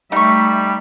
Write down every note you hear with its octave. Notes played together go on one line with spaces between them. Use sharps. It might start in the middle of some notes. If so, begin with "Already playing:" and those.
G3 A3 D#4 E5 C#6